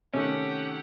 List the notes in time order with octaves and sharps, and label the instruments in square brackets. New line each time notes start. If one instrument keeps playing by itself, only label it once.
[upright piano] C3 D#3 A3 [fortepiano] C#4 [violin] G4 F#5